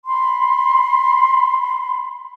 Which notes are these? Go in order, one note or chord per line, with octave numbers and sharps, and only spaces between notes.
B5 C6